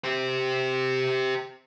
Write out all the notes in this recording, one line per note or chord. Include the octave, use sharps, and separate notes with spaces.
G4 C5